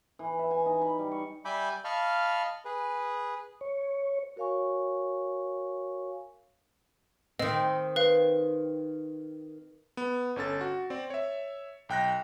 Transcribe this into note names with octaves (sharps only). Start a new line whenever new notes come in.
E3
E5
G#5
D#4
B5
G3
C#6
G3 E5 G#5 B5 D6 G6
D#5 F5 A5 B5 C#6 F6
G#4 B4
C#5
F#4 A#4 C#5 F5 G#5 C#6
D#3 C4 D#5
B4 F5
B3
G1 C#4 A4 A6
F#4
C4 D5
C#5 E5
B1 G5 F#6 A#6